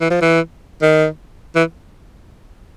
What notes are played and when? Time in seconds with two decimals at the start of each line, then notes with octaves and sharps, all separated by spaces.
0.01 E3
0.10 F3
0.22 E3
0.82 D#3
1.55 E3